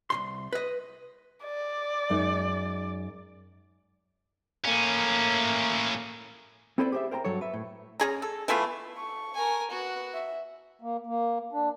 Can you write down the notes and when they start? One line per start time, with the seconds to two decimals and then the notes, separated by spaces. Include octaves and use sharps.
0.10 C2 G#2 C6
0.53 B4 D#5
1.45 D5
2.10 F#2 G#3 D#4
4.65 A2 A#3 C#4
6.78 C4 E4 A4 B4 C5 D5
6.92 G4 G#4 C5 D#5 E5
7.11 A#4 C5 G5 A5 A#5
7.25 G2 F#3 A4 C#5
7.41 B4 E5
7.54 A2
8.00 C#4 G#4 A#5
8.22 A4
8.48 E3 A3 B3 F4
8.97 A4 C#6
9.34 A#4 G#5
9.70 B3 F#4 F#6
10.14 E5
10.81 A#3
11.06 A#3
11.52 D4